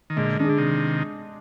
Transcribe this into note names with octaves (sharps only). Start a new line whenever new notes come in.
D#3
A#2 D3 G#3
D#3 D4 G#4
D3
C3 D#3